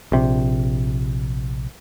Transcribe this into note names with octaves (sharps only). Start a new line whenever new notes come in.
A#1 C3